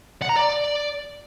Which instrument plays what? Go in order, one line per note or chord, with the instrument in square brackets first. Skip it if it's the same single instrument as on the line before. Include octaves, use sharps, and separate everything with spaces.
[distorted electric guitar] F#5
A#5
D5